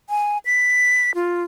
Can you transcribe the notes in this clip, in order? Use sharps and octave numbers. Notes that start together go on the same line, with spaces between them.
G#5
B6
F4